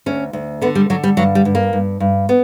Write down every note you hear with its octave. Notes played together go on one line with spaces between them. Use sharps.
D2 C#4
D2
D3 B3
G3
D3 F#3
G3
G2 F#3
G3
G2
A#3
G2
G2
B3